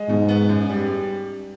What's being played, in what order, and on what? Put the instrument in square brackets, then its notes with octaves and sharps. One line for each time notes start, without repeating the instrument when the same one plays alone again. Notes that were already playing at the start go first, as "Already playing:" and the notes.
Already playing: [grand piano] G#3
[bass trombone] G#2 [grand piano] B2
[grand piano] B3
F#2
G3